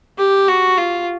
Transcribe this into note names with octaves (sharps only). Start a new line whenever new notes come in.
G4
F#4
F4